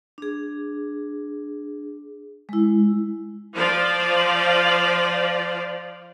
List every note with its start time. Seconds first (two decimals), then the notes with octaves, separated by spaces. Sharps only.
0.18 D4 G#4
2.49 G#3 E4
3.55 F3 F4 C5 D5 F5